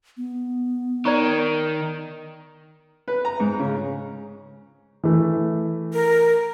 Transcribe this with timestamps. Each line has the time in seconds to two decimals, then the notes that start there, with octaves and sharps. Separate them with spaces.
0.17 B3
1.05 D#3 D5 A#5 C#6
3.08 B4
3.25 A#5
3.40 G#2
3.59 C#3
5.03 E3 A3
5.93 A#4